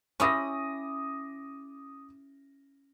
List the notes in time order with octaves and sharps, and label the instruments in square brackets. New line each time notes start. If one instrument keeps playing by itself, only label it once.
[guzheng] C#4 E4 G4 [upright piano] D6 D#6 A#6